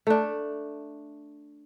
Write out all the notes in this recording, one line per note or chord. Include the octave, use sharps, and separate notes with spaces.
A3 D4